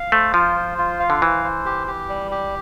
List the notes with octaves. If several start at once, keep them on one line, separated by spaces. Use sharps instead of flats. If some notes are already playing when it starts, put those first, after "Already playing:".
Already playing: F5
A3 C5
F3 F4
C5
F4
F5
D3
E3 C5
C5
G4
G4
G3
G4